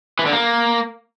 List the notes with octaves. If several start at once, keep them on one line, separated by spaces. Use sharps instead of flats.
E3
D3
A#3